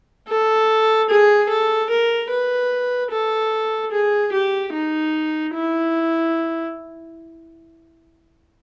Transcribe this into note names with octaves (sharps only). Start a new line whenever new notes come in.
A4
G#4
A4
A#4
B4
A4
G#4
G4
D#4
E4